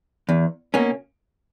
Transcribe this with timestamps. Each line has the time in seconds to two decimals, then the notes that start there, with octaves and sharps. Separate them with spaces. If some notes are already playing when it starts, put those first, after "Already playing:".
0.29 E2
0.74 B2 A#3 C#4